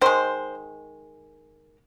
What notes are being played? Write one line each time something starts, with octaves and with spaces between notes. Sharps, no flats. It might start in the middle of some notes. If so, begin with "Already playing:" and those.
D#3 G#3 C5